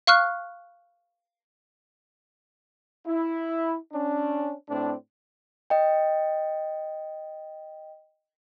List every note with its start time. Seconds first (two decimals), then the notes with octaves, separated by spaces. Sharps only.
0.07 F5 C#6 F6 F#6
3.07 E4
3.92 C#4 D4
4.69 A2 C4 D4
5.70 D#5 G5